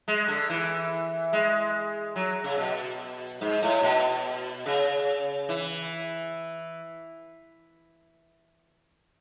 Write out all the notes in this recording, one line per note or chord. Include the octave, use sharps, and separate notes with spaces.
G#3
D3
E3
G#3
F#3
C#3
B2
G#2
A2
B2
C#3
E3